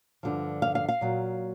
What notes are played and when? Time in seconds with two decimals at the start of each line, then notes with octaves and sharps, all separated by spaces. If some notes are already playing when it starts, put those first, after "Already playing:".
0.23 G2 D3 F3
0.62 F5
0.75 F5
0.89 F5
1.01 A#2 F#3